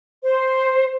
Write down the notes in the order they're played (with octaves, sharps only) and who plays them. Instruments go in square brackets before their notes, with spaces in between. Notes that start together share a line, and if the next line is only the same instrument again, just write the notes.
[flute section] C5